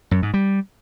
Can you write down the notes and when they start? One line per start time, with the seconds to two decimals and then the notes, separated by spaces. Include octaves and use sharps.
0.11 F#2
0.22 G#2
0.34 G3